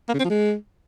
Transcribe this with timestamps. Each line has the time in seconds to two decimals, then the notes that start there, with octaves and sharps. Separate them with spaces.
0.08 A#3
0.14 C#3
0.19 C4
0.24 F3
0.30 G#3